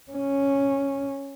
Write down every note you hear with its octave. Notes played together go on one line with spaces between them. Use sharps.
C#4